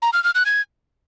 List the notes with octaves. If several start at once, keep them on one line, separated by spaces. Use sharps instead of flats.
A#5
F6
F6
F#6
G#6